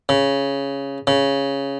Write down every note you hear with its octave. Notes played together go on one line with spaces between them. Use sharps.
C#3
C#3